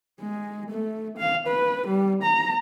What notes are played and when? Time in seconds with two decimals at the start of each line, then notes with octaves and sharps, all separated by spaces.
0.21 G#3
0.71 A3
1.18 F5
1.47 B4
1.87 G3
2.23 A#5